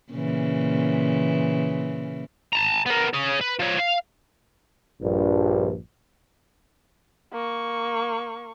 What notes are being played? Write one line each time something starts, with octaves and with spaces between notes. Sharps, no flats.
A#2 C#3 E3
A5 A#5
B3 A#4
G#4 C#5
B4
F3 C#5
F5
A#1 G2
A#3 C#6